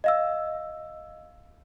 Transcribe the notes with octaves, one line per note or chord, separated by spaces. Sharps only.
D#5 F5 E6